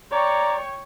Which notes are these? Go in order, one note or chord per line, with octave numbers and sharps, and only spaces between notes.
C#5 D5 G5 A#5 C#6